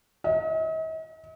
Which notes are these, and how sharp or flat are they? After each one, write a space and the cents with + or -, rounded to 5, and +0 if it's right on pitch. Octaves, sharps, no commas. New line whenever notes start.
D#5 +45